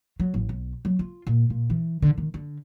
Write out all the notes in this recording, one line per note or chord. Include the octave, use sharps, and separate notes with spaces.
F#3
A1
B1
F#3
F4
A#2
A#2
E3
D3
D#3
D3